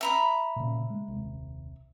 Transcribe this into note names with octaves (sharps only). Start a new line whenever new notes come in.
E5 A#5 B5
A#2 C#3
G#3
D#1 C2